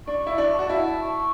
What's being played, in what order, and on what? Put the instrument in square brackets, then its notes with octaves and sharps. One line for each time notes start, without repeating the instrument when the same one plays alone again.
[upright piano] D4 [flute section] C#6
[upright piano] E4
D4
[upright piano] F#4 [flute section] A5
[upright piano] E4
[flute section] C#6